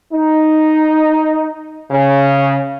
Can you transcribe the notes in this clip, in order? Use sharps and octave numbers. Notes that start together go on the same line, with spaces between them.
D#4
C#3